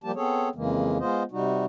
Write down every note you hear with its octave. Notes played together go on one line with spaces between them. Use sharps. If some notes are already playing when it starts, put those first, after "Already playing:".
F3 G3 A#3 G4 A5
B3 C4 G#4 A4 C#5
F2 C#3 E3 G#3 A#3
G#3 B3 F4 C5 D#5
C3 G3 D#4 F#4